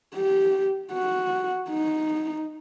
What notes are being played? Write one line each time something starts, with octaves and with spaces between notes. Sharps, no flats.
G4
F#4
D#4